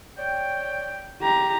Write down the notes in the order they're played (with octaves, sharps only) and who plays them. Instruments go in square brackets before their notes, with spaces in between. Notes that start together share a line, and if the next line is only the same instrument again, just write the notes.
[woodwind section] C#5 D5 G5
[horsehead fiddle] G4 A#5